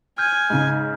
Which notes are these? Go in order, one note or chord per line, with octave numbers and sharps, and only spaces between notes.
G#5 F6 G6 G#6
G#2 C#3